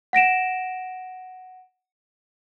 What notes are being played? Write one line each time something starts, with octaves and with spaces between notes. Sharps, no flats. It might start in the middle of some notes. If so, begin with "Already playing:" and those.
F#5 A#6 D7 E7